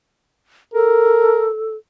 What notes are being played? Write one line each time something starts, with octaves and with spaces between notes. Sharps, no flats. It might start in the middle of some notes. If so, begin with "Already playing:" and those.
A4 A#4